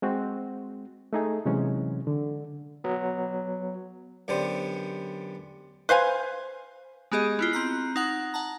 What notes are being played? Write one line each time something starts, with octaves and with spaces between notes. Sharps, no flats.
G#3 C4 F#4
A3 D#4 G#4
C3 E3 F#3 G#3 C#4
D3
F#3 B3
F#2 D3 B3 G4 C5
B4 C5 F5 G#5
G#3 B3 G4 G#4 D#5
B3 E4 F4
C4 A#5 F#6
D#4 F#5 F#6
F#5 A5 A#5